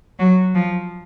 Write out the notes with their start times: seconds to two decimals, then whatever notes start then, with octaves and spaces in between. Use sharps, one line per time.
0.19 F#3
0.55 F3